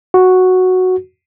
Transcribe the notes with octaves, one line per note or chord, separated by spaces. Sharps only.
F#4